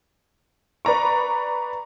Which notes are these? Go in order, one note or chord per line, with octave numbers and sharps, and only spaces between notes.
B4 D5 A#5 C#6